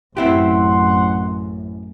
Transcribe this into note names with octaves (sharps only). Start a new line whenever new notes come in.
A1 F#2 C4 E4 G4 F#5 C6